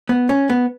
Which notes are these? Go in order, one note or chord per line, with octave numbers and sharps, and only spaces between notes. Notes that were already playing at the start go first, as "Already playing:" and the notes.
B3
C#4
B3